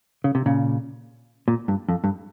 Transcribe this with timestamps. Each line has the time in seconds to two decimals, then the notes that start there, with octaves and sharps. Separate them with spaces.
0.24 C#3
0.35 C3
0.46 A#2 C#3
1.48 A#2
1.68 G2
1.89 F2
2.04 G2